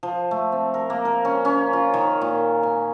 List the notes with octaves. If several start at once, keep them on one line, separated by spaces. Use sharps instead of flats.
F3
A3
C4
A#4
A#3
A#4
C#4
C#4
F4
D#3
A#2
G#5